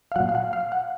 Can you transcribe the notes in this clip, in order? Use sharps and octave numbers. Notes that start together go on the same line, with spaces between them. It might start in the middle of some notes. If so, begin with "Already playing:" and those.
F5
A#2 F#3 F#5
F5
F#5
F5
F#5